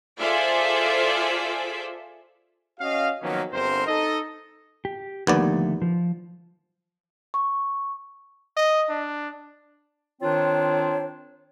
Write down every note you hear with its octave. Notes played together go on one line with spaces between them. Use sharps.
F4 G#4 A4 C5 D5 E5
C#4 F#4 D#5 F5
D#3 F3 F#3 A#3 B3 C#4
G1 G2 C4 A#4 C5
D#4 A4 D#5
G4
D#2 D3 F3 A3 B3 D5
F3
C#6
D#5
D4
D#3 C4 D4 F4 C5 C#5